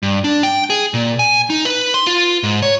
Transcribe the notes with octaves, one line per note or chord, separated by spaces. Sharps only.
G2
D4
G5
G#4
A#2
G#5
D#4
B4
C6
F4
G#2
C#5